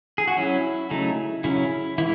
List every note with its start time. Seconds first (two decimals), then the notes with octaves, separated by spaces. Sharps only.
0.18 G#4
0.28 F#4
0.37 F#3 C#4 E4
0.90 C#3 F#3 A3 D#4
1.44 C#3 F#3 C#4 E4
1.98 E3 G#3 E4